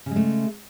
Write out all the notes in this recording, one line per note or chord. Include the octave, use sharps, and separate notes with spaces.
C#3 G#3 A3